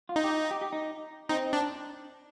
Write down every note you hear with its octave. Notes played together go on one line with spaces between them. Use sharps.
F4
D#4
G4
G4
G4
D#4
C4 D#4
D4